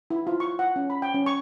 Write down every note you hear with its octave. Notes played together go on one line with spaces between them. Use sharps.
E4
F4
C#6
F#5
C#4
B5
G5
C#4
C#6